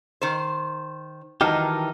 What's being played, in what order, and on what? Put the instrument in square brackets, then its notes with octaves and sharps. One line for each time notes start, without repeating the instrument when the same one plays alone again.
[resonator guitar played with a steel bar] D#3 C5
[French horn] D#3 [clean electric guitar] E3 D#4 G4 [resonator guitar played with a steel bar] F#3 [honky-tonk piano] A5 F6